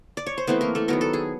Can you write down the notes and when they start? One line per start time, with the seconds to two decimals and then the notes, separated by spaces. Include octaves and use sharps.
0.17 D5
0.26 C#5
0.38 C5
0.47 E3 A3 B3 C4 B4
0.61 A#3 A#4
0.75 A3 A4
0.88 D#3 F#3 B3 A#4
1.01 A4
1.13 G#4